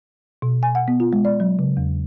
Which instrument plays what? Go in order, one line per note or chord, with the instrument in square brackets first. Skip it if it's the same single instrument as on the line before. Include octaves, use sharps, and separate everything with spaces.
[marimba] B2
G#5
F#5
B3
F4
G#3
D5
F#3
C#3
E2